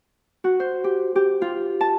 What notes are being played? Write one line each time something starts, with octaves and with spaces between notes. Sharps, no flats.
F#4
C5
G4
G4
F4
A5